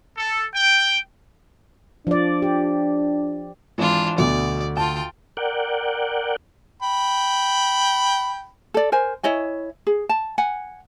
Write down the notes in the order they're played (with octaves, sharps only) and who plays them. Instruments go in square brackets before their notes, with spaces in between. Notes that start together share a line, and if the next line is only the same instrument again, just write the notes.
[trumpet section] A4
G5
[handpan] F3 D5 [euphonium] D4
[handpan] G4
[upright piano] G#1 [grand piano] E3 [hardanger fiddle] D4 F4
[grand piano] D2 F#4 [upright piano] B2 [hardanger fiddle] D5
[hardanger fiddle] F4 G5 [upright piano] A5
[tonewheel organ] A#4 D5 F#5 G5
[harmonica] G5 B5
[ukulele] A4 D5
A#4 C5 G#5
E4 C#5 D#5 G#5
G#4
A5
F#5 G#5